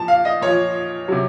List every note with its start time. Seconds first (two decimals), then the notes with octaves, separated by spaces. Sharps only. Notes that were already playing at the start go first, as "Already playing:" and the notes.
Already playing: A#2 F3 A5
0.08 F5
0.25 D#5
0.41 A#2 F3 C#5
1.08 C3 F#3